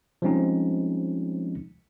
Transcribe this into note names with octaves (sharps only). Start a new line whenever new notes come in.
F3 G3 G#3 C4 C#4 D#4